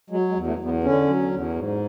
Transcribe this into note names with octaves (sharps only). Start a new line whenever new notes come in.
F#3 G#3
G#3
E2
A3
E2
B3
D3 C#4
F#3
E2
G#2